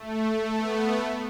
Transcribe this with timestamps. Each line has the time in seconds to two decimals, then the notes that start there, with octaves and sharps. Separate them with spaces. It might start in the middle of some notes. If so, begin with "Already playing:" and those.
Already playing: A3
0.26 A3
0.58 B3
0.90 A3